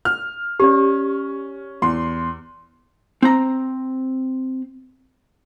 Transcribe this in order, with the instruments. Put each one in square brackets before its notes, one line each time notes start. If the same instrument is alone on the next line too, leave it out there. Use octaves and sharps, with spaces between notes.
[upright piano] F6
[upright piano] C#4 [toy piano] G4 D5
[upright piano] E2 C6
[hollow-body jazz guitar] C4 A#5